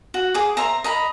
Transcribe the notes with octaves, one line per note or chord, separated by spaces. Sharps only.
F#4
G#4 D6
C5 E5 A#5
D#5 A#5 B5